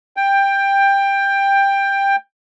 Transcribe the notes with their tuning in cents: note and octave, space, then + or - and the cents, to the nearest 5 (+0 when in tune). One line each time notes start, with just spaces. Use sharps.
G5 +15